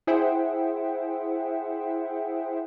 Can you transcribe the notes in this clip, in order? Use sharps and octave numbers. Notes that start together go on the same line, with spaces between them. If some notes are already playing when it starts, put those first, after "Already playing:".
E4 G#4 C5 E5 F#5 G5